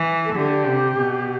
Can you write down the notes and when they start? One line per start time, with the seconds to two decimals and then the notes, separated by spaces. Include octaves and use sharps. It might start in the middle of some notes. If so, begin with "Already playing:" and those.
Already playing: E3
0.25 A4
0.35 D3 G4
0.67 C3
0.98 B2